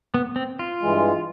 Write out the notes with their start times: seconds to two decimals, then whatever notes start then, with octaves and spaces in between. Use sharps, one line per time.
0.14 B3
0.36 C4
0.59 F4
0.82 G2 E3 G#3